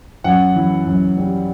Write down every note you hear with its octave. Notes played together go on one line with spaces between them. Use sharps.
F#2 F#5
E3
F#2
G3